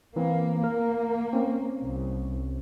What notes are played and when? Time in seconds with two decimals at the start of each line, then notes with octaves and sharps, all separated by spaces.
0.16 E3 A#3 C4
0.64 A#3 A#4
1.33 C4 C#4
1.84 C2